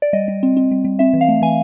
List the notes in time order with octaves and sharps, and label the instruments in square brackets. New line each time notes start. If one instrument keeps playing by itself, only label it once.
[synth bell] D5
G3 D#5
G3
C4
C4
G3
G3
C4 E5
E3
F5
A3
E3 G#5